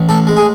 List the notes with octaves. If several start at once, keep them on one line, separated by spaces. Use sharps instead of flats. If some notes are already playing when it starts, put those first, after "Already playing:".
Already playing: A1
A2 A4
G#3
G#4